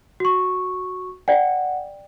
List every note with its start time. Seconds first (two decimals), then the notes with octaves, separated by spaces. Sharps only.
0.20 F#4 C#6
1.28 D5 F#5 G5